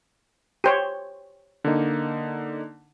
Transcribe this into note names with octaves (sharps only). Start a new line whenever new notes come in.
G4 C5 C#5
D3 A#3 D#4